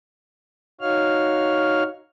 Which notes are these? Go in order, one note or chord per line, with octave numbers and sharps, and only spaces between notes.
D#4 F#4 C#5 F5 F6